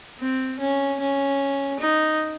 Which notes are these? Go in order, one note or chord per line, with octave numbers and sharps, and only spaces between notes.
C4
C#4
C#4
D#4